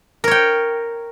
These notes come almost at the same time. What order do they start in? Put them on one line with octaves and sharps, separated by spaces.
A#4 C#5 G5